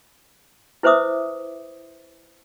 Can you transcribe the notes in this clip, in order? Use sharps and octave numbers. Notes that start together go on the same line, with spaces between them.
E4 B4 C5 E5 D6 D#6